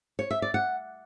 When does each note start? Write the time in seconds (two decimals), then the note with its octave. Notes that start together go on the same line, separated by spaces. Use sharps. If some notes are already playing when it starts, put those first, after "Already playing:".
0.19 C#5
0.31 E5
0.42 D5
0.54 F#5